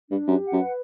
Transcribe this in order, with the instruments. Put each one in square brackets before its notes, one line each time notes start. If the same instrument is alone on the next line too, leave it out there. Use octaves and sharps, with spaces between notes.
[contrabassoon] G2 [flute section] D4
[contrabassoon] F#2 [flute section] G4
[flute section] F#5
[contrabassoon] F#2
[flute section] B4